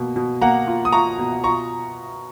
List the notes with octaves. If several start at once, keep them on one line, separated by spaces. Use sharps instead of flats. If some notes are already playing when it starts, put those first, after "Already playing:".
Already playing: B2 A#3
B2
A#3 F#5 A#5
F4
D#6
F4 A#5 C#6
B2
F4 A#5 C#6